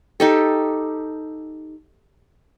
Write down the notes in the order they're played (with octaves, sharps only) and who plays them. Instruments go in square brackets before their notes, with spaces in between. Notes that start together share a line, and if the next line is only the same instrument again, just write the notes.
[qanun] D#4 G4 A4